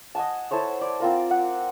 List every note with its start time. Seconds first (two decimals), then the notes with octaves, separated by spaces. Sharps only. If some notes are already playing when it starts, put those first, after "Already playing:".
0.15 D#5 F#5 G#5 A5
0.51 E4 A4 C5 C#5
0.81 D5
1.00 C4 F4 A#4
1.31 F#5